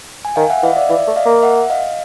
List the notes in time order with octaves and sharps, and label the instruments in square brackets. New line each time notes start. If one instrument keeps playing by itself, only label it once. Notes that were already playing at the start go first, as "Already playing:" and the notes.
[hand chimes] G#5
[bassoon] D#3 [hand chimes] F5 G5
[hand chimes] E5 F#5
[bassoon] E3 [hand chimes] D#5 F5
[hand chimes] D5 E5
[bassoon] E3 [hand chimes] D5 E5
[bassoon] A3
[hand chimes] D#5 F5
[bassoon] A#3
[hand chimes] E5 F#5
D#5 F5